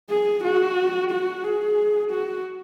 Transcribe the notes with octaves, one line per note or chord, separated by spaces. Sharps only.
G#4
F#4
F#4
G#4
F#4